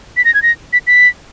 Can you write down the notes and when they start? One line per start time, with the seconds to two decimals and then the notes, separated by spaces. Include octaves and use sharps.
0.17 B6
0.25 A#6
0.34 G#6
0.42 A#6
0.73 B6
0.87 B6